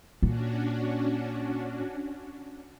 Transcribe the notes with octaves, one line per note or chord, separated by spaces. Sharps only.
A#2 C#4 D4 F#4